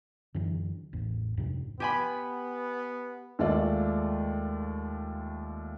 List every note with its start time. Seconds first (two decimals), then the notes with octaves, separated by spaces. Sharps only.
0.34 F#2 D3 E3 D4
0.93 A1 E2
1.37 F2 G#2 C3
1.80 B3 G4 G#5 B5
3.39 D#2 G#3 A3 F4 D5